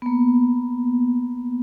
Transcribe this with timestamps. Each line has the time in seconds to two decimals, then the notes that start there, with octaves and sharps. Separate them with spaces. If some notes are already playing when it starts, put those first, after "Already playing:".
0.02 B3
0.06 A#3